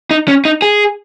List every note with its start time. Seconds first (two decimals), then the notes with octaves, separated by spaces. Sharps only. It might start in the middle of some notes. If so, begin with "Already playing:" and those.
0.11 D#4
0.28 C#4
0.45 D#4
0.62 G#4